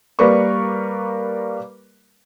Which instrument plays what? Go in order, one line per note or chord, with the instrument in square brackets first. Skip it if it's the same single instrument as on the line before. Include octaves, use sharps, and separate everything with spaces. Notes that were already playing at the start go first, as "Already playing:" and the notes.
[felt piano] G3 A#3 A#4 B4 D5 C#6